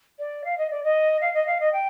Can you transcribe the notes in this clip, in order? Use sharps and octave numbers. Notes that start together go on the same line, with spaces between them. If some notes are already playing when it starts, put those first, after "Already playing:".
D5
F5
D#5
D5
D#5
F5
D#5
F5
D#5
G5